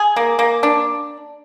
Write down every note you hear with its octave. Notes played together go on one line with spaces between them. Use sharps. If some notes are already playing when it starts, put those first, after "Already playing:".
Already playing: G#4
A#3
A#3
D4